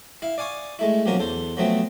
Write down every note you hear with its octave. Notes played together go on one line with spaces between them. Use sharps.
E4 F5
D5 F5 G#5 C#6 D#6
G#3 A3 E4
B1 F3 F#3 A#3 C#4 A#4
E2 A4 C5
F3 F#3 A3 B3 C4